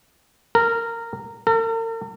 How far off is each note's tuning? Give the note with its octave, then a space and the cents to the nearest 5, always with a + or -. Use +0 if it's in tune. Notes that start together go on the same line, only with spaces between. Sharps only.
A#4 -15
A#4 -45